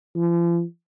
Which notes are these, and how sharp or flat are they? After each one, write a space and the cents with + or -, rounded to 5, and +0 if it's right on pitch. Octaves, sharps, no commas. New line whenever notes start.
F3 -40